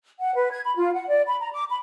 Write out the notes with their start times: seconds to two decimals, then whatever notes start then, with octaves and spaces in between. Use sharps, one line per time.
0.20 F#5
0.36 B4
0.52 G#6
0.65 B5
0.77 F4
0.94 F#5
1.08 D5
1.27 B5
1.40 A#5
1.52 D6
1.69 B5